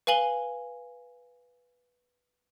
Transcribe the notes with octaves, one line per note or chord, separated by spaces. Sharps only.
B4 F5 G#5 F#7 G7